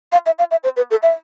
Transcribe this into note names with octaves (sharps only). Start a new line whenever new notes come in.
F5
E5
F5
E5
C5
B4
A4
E5